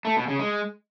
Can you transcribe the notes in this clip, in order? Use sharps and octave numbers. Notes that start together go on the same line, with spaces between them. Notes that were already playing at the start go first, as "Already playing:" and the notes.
A3
B2
C#3
G#3